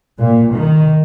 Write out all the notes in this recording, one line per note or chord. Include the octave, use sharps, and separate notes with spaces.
A#2
D#3